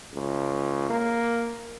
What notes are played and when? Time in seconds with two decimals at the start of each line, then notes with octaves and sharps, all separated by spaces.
0.13 C#2
0.90 A#3